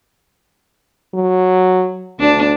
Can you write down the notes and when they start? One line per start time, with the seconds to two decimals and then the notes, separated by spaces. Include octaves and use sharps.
1.14 F#3
2.20 D2 D4